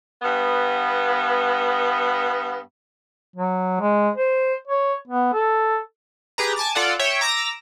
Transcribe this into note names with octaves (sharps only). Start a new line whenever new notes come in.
G2 B3
F#3
G#3
C5
C#5
B3
A4
G4 G#4 B4 A#5
G#5 A5 D6 A6
F4 A4 D5 F#5
C#5 E5 G5
A#5 D6 E6 A#6